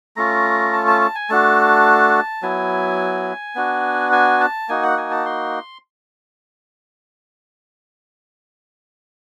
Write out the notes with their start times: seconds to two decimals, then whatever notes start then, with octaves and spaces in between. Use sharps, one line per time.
0.16 A3 C#4 F4 A#5
0.73 A5
0.87 A5
1.01 A5
1.15 G#5
1.30 A3 D4 F#4 A5
2.42 F#3 B3 E4 G#5
3.55 B3 D4 F#4
4.12 G#5
4.40 A5
4.69 A#3 D#4 F#4 G#5
4.83 F#5
4.97 G#5
5.11 A5
5.26 C6